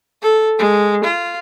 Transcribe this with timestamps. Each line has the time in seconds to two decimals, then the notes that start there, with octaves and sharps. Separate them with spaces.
0.22 A4
0.59 G#3
1.04 F4